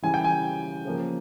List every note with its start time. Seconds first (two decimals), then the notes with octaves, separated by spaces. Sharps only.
0.02 C#3 E3 G3 G#5
0.14 G5
0.24 G#5
0.85 C#3 F3 A#3